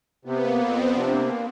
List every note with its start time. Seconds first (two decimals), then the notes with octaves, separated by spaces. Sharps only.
0.25 C3 B3
0.42 A#3
0.60 F2 C4
0.77 F3
0.93 C3 D4
1.10 A#3